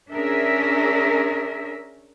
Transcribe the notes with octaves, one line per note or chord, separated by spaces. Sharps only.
C#4 D4 G#4 A#4 E5